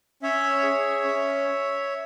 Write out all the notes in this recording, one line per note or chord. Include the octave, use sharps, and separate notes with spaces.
C#4 C#5 E5
G#4
C#4